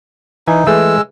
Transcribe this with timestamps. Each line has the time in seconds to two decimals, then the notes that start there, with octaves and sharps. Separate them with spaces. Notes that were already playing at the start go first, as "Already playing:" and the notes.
0.48 E3 D#4 G#5
0.67 E3 G#3 A3 G#4 E6